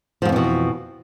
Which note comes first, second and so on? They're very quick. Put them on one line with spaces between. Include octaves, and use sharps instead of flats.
F3 G#2 F2 E3 B2